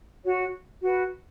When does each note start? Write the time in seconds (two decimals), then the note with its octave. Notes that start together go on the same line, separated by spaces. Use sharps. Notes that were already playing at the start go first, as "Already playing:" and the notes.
0.24 F#4 C#5
0.82 F#4 B4